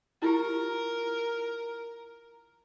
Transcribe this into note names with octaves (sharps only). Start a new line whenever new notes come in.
E4 F4 G4 A#4